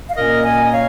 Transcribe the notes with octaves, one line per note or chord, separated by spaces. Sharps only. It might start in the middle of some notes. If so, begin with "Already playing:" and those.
F5
A#2 A#3 C#4 A#4 D#5
D#5 G#5
D#5
C#5 F5